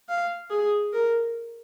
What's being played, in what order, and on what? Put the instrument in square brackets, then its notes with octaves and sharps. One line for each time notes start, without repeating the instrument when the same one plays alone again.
[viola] F5
G#4
A#4